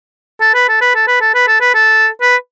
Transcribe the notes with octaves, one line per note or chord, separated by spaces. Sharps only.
A4
B4
A4
B4
A4
B4
A4
B4
A4
B4
A4
B4